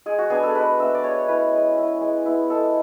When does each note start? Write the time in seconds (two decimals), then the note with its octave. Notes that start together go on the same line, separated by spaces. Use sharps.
0.06 G#3 G#4
0.18 F#4
0.30 B3 D4 G#4
0.43 A4
0.55 G#3 B4
0.79 B3 D4 E5
0.94 D5
1.03 G#3 C#5
1.28 C#4 E4 B4
1.52 G#3
1.76 C#4 E4
2.01 G#3
2.26 B3 E4
2.50 G#3 A4